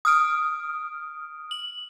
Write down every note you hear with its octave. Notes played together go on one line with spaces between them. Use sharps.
D#6 F6 D7
F#7